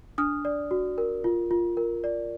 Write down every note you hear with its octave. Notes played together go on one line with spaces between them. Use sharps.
D4 D#6 F6
D5
F#4
A#4
F4
F4
A#4
D5